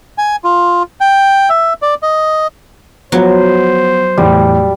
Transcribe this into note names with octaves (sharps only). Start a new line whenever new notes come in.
G#5
F4
G5
E5
D5
D#5
F3 F#3 B3 F#4 C5
E2 A2 G3